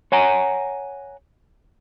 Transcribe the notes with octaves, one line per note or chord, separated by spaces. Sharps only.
C#5 F#5 G#5 A#5